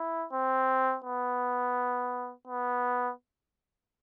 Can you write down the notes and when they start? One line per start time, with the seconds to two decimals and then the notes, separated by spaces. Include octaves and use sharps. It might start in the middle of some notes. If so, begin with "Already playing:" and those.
Already playing: E4
0.33 C4
1.04 B3
2.47 B3